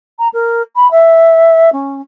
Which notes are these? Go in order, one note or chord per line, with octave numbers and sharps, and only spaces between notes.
A#5
A#4
B5
E5
C#4